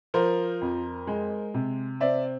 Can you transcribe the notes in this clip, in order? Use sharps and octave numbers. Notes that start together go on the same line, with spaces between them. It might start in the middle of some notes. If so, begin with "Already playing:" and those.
F3 A#4 C5
F2
G#3
C3
C4 D5 E5